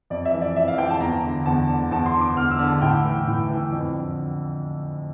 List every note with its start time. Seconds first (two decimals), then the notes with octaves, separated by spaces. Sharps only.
0.10 F2 D5
0.25 E5
0.34 E3
0.41 D5
0.56 F2 E5
0.68 F5
0.78 E3 G5
0.90 A5
1.00 E2 A#5
1.23 D3
1.46 E2 A5
1.69 D3
1.91 E2 A5
2.06 C6
2.14 D3
2.21 D6
2.36 E2 F6
2.51 E6
2.59 D3
2.67 A5
2.81 A2 G5
3.05 E3
3.27 A2
3.50 E3
3.72 F2
3.95 D3